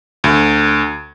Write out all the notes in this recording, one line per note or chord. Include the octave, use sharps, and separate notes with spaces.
D2